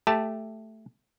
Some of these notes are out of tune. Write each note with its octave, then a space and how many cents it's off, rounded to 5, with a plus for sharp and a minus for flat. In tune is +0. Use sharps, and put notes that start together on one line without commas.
A3 +0 G4 +10 A5 +0